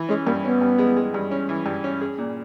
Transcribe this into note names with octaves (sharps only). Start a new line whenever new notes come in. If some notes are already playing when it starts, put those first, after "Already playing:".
Already playing: E3
G#3 C#4
G2 A#3
B3 C#4
G2
G#3
G#3
G2
C#4
E3
G2
C#4
G#4
A#2